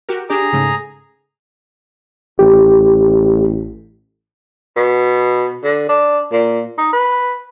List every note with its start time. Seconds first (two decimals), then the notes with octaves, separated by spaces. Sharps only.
0.09 F#4 G4 A#4
0.30 D4 G4 G#4 D5 A#5
0.53 G#2 C#3 A3
2.39 A1 G4
4.77 B2
5.64 D3
5.89 D4
6.32 A#2
6.78 D#4
6.93 B4